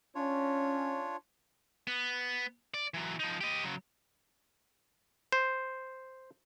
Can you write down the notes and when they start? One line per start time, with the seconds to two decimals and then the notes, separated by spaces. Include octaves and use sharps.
0.15 C#4 D4 F4 C#5
1.87 B3
2.74 D5
2.94 E3 F#3
3.20 F3 D#4
3.41 G4 D#5
3.64 C#3 F#3
5.32 C5